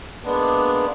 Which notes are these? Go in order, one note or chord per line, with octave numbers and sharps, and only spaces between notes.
G#3 A#3 B3 D4